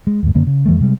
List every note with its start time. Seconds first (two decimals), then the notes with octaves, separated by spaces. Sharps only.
0.07 G#3
0.23 D#2 G#2
0.35 F#2 D3 A#3 C#4
0.47 C#3
0.66 F2 E3 G3 A3
0.80 C3 G3 G#3